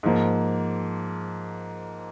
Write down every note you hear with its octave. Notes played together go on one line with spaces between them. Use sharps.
G#2 F3 A#3